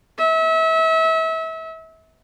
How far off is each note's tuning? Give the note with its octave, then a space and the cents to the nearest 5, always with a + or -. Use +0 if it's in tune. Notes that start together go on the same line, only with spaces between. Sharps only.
E5 -30